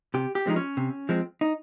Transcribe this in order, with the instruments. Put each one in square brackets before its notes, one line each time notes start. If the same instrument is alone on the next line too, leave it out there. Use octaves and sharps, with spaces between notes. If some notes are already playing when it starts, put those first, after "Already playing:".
[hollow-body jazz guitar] C3 G4
G4
F3 G#3 C4 D#4
C#4
C3
F3 G#3 C4
D#4